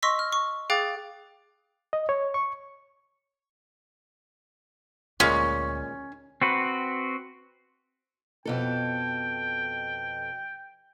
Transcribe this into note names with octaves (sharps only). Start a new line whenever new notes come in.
D#5 C6 C#6 E6 A#6 B6
F6
C#6
G#4 F5 G5 D6 F#6 A6
D#5
C#5
C#6
D2 A#2 G#3 C#4 F4
C4 F#4 B4
F2 B2 A4 G5